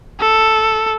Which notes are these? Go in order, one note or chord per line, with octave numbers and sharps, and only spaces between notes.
A4